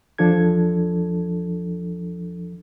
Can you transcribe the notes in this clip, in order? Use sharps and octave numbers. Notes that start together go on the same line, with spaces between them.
E2 F3 D4 A4 G#6